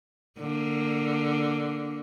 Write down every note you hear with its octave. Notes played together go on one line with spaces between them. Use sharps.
D3 A#3